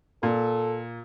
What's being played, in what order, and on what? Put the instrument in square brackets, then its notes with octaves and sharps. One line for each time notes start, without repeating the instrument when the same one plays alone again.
[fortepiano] A#2 [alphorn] A4